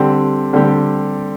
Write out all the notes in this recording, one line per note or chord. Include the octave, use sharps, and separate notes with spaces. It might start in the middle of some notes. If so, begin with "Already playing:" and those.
Already playing: D3 G3 C4 G4
D3 G3 C4 G4